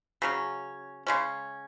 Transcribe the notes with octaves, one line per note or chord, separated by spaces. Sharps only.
C#3 F#3 C#4
C#3 G#3 C#4